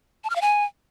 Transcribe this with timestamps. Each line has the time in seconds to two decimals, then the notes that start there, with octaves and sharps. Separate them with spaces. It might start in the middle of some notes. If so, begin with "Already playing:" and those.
0.24 A5
0.30 F6
0.36 F5
0.41 G#5